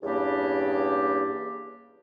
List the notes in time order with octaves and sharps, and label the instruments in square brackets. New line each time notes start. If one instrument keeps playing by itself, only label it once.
[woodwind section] E2 G2 C#3 A#3 D4 G4